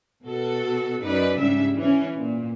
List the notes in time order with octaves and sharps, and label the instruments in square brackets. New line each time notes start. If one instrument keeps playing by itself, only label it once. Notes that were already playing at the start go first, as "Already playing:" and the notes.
[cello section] B2 F#4 A4
F#2 D#4 B4 D5
G#2 C#3 G3 C#4 D4 E5
E3 C#4
A#2